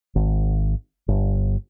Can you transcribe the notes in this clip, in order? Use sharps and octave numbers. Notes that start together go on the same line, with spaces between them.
G#1
G1